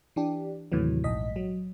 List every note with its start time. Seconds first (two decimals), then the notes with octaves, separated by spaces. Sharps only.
0.16 E3 D4 G4
0.72 D#2 A2 C3 E3 F#3
1.04 A#1 G#2 D#5 B6
1.36 F#3